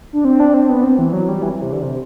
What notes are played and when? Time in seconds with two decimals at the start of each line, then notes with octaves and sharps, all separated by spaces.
0.13 D4
0.25 C4
0.40 D4
0.54 C4
0.69 B3
0.84 C4
0.99 E3
1.13 F#3
1.29 G3
1.42 E3
1.53 E3
1.62 C3
1.73 D3
1.82 C3